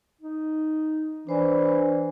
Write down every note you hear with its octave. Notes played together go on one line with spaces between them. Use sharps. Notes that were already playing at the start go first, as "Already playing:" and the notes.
D#4
E3 D4 C5 D5